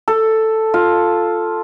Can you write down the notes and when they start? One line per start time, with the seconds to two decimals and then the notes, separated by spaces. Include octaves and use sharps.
0.08 A4
0.74 F4